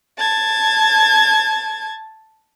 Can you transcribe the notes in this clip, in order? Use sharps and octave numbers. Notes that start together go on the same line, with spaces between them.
A5 G#6